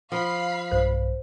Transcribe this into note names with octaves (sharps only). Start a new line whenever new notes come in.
F3 F5 B5 C7
B1 G2 C5